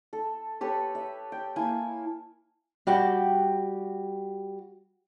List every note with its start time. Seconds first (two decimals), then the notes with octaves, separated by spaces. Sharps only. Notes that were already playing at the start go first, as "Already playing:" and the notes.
0.13 A4
0.61 G4 A4 B4 C#5
0.95 E5
1.32 G5
1.56 A#3 E4 G#5 A5
2.87 G3 F#4 G4 G5